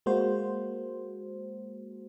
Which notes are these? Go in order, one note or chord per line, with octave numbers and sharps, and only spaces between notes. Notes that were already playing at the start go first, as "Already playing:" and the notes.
G#3 A#3 F#4 C5